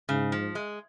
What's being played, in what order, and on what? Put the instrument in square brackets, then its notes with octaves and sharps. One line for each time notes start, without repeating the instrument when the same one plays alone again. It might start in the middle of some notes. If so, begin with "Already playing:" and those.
[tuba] G#2 [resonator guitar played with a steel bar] C#3
[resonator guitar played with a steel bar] F3
G#3